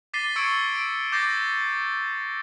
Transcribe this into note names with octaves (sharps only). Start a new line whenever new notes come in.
D6 A6 B6 C7 D#7 G7
C#6 E6 G#6 C#7 D7
D7
D6 G6 A6 A#6 C7